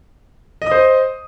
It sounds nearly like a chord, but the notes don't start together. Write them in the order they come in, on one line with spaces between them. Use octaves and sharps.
D#5 D#6 C5